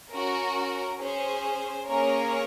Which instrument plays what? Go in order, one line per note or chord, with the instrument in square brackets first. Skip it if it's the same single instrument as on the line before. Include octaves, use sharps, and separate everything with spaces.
[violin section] C#4 F#4 A#4
C#4 G#4 C5
A#3 C#4 G#4 A#4 C#5